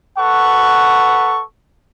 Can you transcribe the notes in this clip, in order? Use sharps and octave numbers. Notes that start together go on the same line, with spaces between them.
A4 B4 F#5 C#6